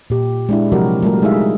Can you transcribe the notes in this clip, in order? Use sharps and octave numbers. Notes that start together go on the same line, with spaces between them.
A#2 G4
G#3 D4 E4
C3 F3 F#3 F#4 G4 A#4
G3 A3 F4 A4 A#4
G#3 D#4 E4 G#4 E5 F5